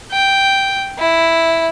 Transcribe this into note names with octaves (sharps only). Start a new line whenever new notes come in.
G5
E4